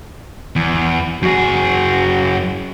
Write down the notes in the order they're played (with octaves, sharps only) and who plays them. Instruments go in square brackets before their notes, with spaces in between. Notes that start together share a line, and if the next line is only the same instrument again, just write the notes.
[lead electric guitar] E2
[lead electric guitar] F#2 G#4 [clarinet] F#4